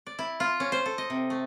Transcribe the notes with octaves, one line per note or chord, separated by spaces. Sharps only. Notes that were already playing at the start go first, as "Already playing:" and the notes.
D5
E4
F4
C#4
C5
A4
D#5
C3
A3